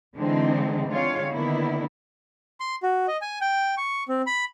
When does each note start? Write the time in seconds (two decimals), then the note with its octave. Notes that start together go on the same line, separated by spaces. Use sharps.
0.17 D3 E3 G#3 C4 D4 D#4
0.89 D3 G#3 C4 F4 C#5 F5
1.30 D3 D#3 A#3 B3 D4 E4
2.60 C6
2.83 F#4
3.07 D#5
3.22 G#5
3.41 G5
3.77 C#6
4.08 C4
4.27 B5